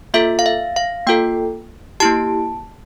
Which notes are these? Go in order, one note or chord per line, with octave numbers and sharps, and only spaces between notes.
A#3 F4 A4 E5
F5
E5
F5
A#3 F4 A4 G5
A#3 E4 G4 A5